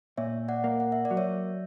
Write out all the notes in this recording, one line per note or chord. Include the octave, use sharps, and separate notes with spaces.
A#2 C#5 E5
D5 F#5
A#3
F#5
E5
D5
F#3
C#5 E5